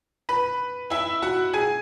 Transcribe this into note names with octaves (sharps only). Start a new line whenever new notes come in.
B4 B5
E4 E5
F#4 F#5
G#4 G#5